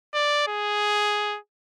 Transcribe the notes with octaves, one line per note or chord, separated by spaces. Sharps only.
D5
G#4